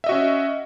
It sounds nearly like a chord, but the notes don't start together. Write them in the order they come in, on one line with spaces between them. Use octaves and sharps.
E5 D#5 F#4 C#4